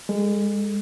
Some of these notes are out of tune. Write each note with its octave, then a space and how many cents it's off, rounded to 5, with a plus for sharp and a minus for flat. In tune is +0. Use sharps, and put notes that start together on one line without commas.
G#3 -25 A4 +0